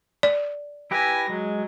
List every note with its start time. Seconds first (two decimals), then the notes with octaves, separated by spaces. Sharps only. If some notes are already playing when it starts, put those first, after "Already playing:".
0.23 D5
0.91 E4 G4 B4 G#5 A#6
1.29 F#3 G#3